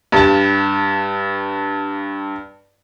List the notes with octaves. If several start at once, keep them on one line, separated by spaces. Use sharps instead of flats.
G2 A5